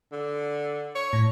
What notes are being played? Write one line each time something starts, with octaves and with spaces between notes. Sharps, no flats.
D3
C#5
A2